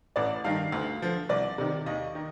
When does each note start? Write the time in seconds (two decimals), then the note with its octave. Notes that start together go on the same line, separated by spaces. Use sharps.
0.16 A1 D5
0.44 G2 D#3 F5
0.72 D2
1.02 D3 F3
1.29 C2 D5
1.58 C3 D#3
1.86 D#2 D#5
2.15 D#3